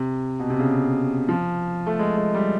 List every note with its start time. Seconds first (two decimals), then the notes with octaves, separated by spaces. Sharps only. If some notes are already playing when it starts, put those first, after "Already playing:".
Already playing: C3
0.39 B2
0.50 C3
0.59 C#3
1.29 F3
1.86 A3
1.99 G#3
2.16 G#3
2.34 G3